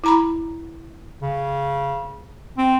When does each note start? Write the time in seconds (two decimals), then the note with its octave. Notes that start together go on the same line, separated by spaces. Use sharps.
0.04 E4 A#5 B5
1.22 C#3
2.58 C4